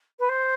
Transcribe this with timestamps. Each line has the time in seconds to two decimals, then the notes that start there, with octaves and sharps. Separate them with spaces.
0.19 B4
0.29 C5